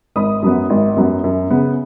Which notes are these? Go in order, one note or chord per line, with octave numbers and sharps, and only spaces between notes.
G#1 B5 D#6
F#2 F#3 B3
G#1
F#2 F#3 B3
F#2
C#3 B3